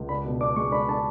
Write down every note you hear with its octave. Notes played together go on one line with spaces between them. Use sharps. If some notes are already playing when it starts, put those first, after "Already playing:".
Already playing: C#2
D4 B5
B2
D4 D6
G#3 C#6
D4 B5
D4 A5